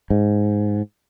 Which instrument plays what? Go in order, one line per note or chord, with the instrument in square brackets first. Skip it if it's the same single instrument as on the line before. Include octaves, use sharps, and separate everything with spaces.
[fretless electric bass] G#2